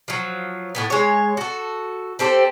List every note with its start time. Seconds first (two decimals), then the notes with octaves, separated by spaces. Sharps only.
0.08 F3 F#3
0.75 A2 C#3 B3
0.90 G#3 C#5
1.37 F#4 A4
2.19 C4 G4 A4 C5